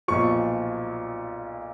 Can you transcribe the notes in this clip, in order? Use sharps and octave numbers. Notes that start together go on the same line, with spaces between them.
B1 A#2 F3 C#6